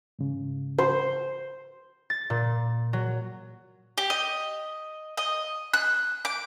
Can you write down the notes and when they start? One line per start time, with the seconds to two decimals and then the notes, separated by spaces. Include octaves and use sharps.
0.19 G#2 C#3
0.78 C5
2.10 A6
2.30 A#2
2.93 F#3
3.98 G4
4.10 D#5
5.17 D#5
5.73 F#6
6.25 D6